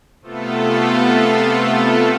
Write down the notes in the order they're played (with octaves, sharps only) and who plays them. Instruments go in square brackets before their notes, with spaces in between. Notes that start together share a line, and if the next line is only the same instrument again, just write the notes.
[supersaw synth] C3 A3 B3 F4 A4